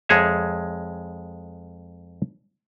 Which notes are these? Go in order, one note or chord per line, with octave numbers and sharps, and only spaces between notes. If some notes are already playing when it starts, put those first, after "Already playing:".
F2 G#3 G#4 C#5 E5